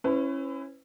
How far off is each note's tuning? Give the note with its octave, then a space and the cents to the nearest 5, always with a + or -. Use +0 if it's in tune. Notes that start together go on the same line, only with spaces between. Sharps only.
C#4 -20 E4 +0 B4 +35